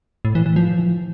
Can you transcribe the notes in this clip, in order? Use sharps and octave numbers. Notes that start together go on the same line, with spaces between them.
A2
E3
E3
F3